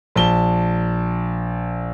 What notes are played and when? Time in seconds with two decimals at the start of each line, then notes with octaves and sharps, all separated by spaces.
0.16 A#1 A5 G7